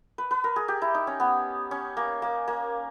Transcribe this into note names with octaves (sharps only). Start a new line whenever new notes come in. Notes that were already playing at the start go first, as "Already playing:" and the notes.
B4
B4
A#4
G#4
G4
E4
D#4
C#4
B3
C#4
A#3
A#3
A#3